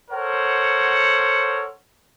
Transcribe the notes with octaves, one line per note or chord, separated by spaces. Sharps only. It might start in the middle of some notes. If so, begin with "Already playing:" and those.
A4 A#4 C5 C#5 F#5